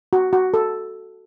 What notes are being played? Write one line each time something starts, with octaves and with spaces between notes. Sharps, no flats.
F#4
F#4
A4